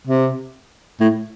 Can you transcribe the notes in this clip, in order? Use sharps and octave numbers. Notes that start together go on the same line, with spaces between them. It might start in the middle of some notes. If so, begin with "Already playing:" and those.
C3
A2